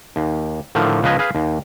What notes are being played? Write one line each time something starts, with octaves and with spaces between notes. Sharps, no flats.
D#2
A2 D3 D#3 F3
C#2 C#3 F3 B4 D#5 G#5
G#4 B4 F5
D#2